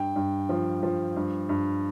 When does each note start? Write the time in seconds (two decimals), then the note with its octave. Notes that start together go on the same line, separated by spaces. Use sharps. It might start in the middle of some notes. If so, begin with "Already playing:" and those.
Already playing: G2 G5
0.16 G2
0.49 F3
0.83 F3
1.16 G2
1.49 G2